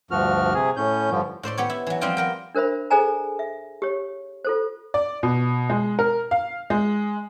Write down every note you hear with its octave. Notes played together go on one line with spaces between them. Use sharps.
D2 G2 F3 F#4 F6
C3 G#4
A2 C#4 G6
G2 D3 F3
A2 C5 D5 C6
B3 G4 C#5
E4
E3 F#3
F3 G3 C4 F4 G5
B3 A#4 G5
D4 A#4 C5 E5 B5
G#4 A4 C5 D5 G#5 A#5
E5
G4 C#5
F4 A4 C5
D5
B2
G#3
A#4
F5
G#3